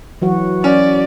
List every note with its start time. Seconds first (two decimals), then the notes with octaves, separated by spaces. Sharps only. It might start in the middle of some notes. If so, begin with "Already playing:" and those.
0.22 E3 F#3 F#4
0.64 C#4 D5